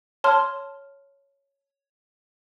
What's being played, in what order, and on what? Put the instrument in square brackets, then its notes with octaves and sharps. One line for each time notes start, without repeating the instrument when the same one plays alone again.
[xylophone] C#5 A5 C6 F6